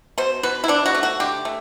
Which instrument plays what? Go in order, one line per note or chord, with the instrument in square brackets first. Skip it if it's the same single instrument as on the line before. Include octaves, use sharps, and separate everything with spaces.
[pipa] B2 C5
B2 B4
E4
B2 D4
F#4
A3
F#4
D3 G4
A3